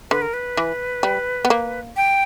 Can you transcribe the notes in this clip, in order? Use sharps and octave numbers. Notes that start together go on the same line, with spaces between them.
D3 B4
A#4
B4
E3
G3
B3
A#3
G5